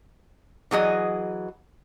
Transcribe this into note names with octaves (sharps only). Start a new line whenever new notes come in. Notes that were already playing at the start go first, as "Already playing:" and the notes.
E3 F#3 G#4 D#5